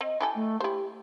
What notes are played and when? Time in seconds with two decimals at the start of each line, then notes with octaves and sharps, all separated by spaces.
0.01 C4 D#5
0.20 E4 G4 A4 G#5
0.34 A3
0.60 E4 G4 C5